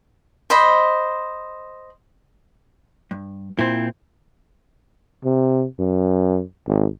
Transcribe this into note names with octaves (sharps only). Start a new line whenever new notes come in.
C5 D#5 B5
G2
A#2 C4 E4 C5
C3
F#2
G#1